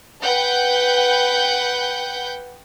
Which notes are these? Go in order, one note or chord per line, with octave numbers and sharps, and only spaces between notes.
B4 F#5 G5 G6